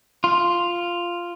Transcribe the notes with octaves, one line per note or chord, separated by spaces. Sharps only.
F4